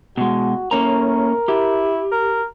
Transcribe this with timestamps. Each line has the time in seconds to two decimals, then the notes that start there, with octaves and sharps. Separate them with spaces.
0.17 B2 G#3 F#4
0.71 A2 A#3 C#4 A#4 A#5
1.48 E4 G4
2.12 A#4